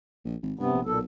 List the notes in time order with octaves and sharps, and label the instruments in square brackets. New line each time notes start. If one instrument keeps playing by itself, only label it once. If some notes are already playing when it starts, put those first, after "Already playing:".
[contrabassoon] A#1
G#1
[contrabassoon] G2 [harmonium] C3 B3
[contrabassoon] A#1
[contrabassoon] B1 [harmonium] A#2 A4